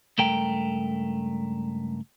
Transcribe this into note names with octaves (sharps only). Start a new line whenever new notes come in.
C#2 G2 A3 A#4 G5